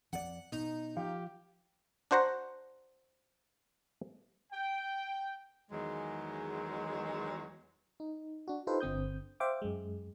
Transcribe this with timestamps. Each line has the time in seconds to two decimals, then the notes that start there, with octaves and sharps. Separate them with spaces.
0.13 F2 D5 F#5
0.52 B2 D#4
0.97 F3 G4 F5
2.11 D4 F#4 C5 F#5 A#5
4.53 G5
5.70 E2 D#3 F#3 G#3
8.00 D#4
8.48 D4 F#4
8.67 D#4 F4 G4 A4 B4 C5
8.80 G1 D3 C4 D#6 G6
9.40 C5 E5 F5 G5 D6
9.62 F#2 G#3